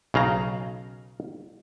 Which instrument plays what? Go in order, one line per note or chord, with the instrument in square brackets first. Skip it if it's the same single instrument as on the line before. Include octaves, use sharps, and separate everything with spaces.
[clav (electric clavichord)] B1 C#3 F5 A#5